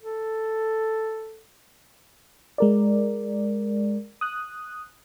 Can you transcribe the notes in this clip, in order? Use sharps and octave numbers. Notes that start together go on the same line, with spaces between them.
A4
G#3 A#4 D5
D#6 F#6